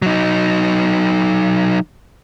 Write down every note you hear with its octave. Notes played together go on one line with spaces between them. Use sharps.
F#3 D#4